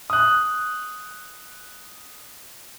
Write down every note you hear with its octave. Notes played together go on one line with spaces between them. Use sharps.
D#6 F#6